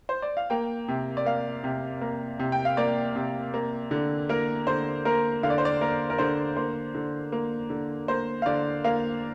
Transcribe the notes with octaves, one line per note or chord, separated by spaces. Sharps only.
C5
D5
F5
A#3 G5
C3
D5
A#3 F5
C3
A#3
C3
G5
F5
A#3 D5
C3
A#3
D3
A#3 A#4
D3 C5
A#3 A#4
D3 F5
D5
C5
D5
A#3 A#4
A#4
D3 C5
A#3 C5
D3
A#3
D3
A#3 C5
F5
D3 D5
A#3 F5